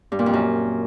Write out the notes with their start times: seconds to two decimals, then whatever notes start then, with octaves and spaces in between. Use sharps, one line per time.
0.12 G2
0.19 A#2
0.26 F2
0.33 F#2